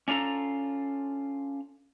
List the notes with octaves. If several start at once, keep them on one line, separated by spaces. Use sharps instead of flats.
C#4 D4 F4 A4 A#5